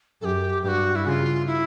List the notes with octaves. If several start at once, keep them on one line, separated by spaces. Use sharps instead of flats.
F#2 G4 A4
G2 G4
F#4
E4
C#3 F4 F#4
E4